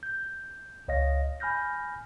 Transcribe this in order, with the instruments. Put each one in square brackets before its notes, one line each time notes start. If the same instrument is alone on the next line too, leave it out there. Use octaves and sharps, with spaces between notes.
[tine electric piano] G6
C#2 C#5 D#5 F5 A#6
G#5 B5 F6 G6 A#6